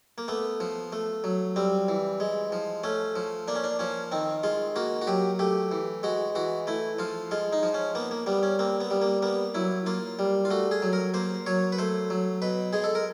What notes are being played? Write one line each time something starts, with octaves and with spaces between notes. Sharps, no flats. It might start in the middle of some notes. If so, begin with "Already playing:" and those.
A#3
A3 B3
F3
A3
F#3
G3 C4
E3
G#3
F3
A3 C#4
F3
A#3 D4
C#4
D4
F3 C#4
D#3 C4
G#3 F4
A#3 F#4
F#4
F#3 G4
A3 G4
E3
G#3 F#4
E3 F#4
A3 E4
F3 F4
G#3 F4
D#4
F3
C#4
A#3 B3
A#3
G3 B3
C#4
A#3 C4
B3
G3
A#3
A#3 B3
F#3 E4
A#3 F4
G3
F4
A3 F#4
G#4
F#3
A#4
A#3 C5
F#3 C#5
B4
A3 C5
F#3
B2 B4
G#3 G#4
A4
A#4